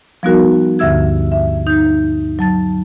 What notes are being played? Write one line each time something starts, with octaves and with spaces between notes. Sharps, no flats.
F3 G3 B3 D#4 F#4 A#4
D2 G2 D3 E5 E6 G#6
E5
D#4 G6
F#3 A5 A6